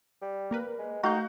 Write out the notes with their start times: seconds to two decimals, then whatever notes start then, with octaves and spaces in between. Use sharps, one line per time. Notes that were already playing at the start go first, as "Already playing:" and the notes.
0.22 G3
0.51 A#3 A#4 B4
0.79 G#3
1.03 A3 D#4 F#4 F5 G6